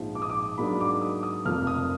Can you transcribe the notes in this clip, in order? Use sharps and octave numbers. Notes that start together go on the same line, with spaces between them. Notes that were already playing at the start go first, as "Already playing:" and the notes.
Already playing: A#1 G#2 F3
D6
D#6
D6
G#2 F#3 A#3 D4 B5
D6
D#6
D#6
F1 F2 F3 A#3 F6
D#6